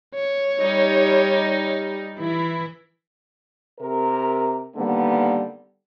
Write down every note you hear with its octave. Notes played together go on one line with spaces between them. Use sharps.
C#5
G3 D#4
E3 E4
C3 A#4
D3 D#3 G3 A#3 B3